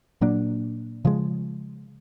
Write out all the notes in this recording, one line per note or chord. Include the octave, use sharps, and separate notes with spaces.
A#2 F#3 A#3 D4
C#3 F3 G#3